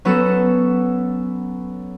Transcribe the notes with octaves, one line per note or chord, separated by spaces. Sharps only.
F#3 B3 C#4 F#4 A4 E7